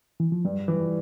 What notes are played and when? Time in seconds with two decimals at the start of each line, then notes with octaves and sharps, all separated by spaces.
0.20 E3
0.32 F3
0.45 G2 G3
0.68 E3